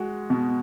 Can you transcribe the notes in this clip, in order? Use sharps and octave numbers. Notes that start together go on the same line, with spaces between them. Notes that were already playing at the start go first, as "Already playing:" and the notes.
Already playing: G#3 F#4
B2